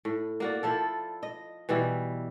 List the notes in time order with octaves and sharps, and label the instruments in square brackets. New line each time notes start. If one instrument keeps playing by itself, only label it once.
[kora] A2
A#3 F#4 D5
F3 E4 A4
D#5
B2 E3 G3 E5